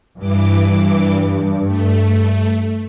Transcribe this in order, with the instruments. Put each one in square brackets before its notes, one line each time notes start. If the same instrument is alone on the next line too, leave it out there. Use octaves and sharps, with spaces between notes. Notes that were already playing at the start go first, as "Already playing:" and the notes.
[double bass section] G2 [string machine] E3 D6
[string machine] A3